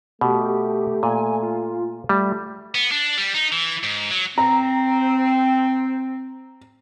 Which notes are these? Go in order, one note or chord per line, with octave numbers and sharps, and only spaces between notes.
B2 A3 G4
A#2 G#5
F4
G3 A3
B3
D4
G3
D#4
E3
G#2
F#3
C4 A#5